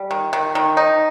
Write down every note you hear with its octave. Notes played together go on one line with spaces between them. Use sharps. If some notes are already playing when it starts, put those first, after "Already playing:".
Already playing: G3
D#3
D#3
D#3
D#4